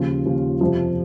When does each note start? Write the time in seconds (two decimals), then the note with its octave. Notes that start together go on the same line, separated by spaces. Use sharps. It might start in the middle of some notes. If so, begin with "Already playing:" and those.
Already playing: D#2 C#3 F3 F4
0.25 D#2 C#3 F3
0.61 F2 C3 F3